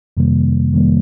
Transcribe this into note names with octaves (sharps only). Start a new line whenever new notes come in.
F2 C3 D#3 G3 A#3
F2 C3 D#3 G3 A#3